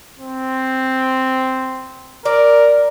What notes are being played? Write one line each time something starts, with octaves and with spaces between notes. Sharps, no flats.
C4
A#4 D5